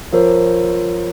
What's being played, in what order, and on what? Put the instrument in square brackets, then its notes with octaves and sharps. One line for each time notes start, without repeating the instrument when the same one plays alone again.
[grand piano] F3 [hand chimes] F4 A#4 C#5